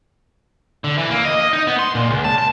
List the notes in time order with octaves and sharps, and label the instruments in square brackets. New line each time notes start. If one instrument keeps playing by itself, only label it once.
[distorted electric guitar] D3
E3
A#3
D#5
D#5
D#4
B3
C6
A#2
C#2
A5
A5